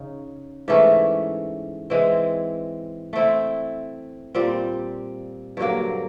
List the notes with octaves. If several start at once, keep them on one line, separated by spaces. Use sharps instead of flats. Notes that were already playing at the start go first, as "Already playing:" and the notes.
Already playing: C#3 D#4
G#2 E3 A3 C#4
E3 G#3 C4
A3 C4 E4
A#2 G3 C4
G2 D3 F#3 A#3